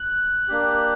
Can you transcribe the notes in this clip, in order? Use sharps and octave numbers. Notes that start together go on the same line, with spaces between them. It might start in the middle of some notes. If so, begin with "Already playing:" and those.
Already playing: F#6
A#3 D4 G4